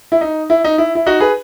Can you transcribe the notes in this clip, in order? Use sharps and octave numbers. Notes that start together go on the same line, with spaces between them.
E4
D#4
E4
D#4
E4
E4
D#4 F#4
G#4 B4